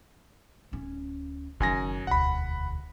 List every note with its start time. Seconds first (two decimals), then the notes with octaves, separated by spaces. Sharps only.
0.71 D1 C#4
1.60 F#1 F#2 D#3 G#5 A#6
2.07 E1 D2 F#5 B5